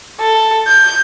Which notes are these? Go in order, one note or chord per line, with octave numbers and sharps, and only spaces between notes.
A4
G6